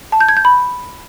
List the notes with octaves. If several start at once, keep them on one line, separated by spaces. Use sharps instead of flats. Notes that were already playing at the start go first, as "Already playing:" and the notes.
A5
G6
G#6
G6
B5